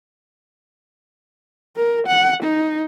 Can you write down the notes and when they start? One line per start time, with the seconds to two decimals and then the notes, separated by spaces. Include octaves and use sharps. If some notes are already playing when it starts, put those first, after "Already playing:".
1.76 A#4
2.07 F#5
2.43 D#4